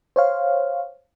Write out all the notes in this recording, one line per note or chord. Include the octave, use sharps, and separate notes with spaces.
C5 C#5 F5